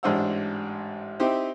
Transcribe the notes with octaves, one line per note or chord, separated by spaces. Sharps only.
A1 G#2 D4 C5 F#5 E6
C4 D#4 E4 G4 C5